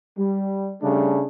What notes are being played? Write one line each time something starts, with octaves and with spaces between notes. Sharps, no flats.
G3
C#3 G3 A3 D4